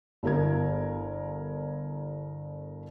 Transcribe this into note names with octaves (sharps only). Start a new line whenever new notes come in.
G1 E4 A#4 G#6